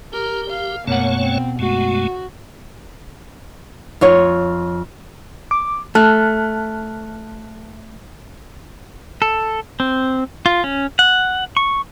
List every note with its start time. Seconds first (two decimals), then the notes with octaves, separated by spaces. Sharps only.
0.13 G4 A#4
0.50 F5
0.87 F#2 B2 A3 A#3 C#5 F#5
1.20 C4
1.59 F#2 G#3 A3 F#4
4.01 F2 F4 C#5
5.51 D6
5.95 A3 A5 F6 F#6
9.22 A4
9.80 C4
10.46 F4
10.64 C#4
10.99 F#5
11.57 C#6